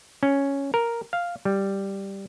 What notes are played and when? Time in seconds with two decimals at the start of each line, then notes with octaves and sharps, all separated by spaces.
0.23 C#4
0.74 A#4
1.13 F5
1.45 G3